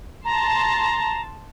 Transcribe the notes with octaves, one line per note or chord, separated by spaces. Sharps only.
A5 A#5 C6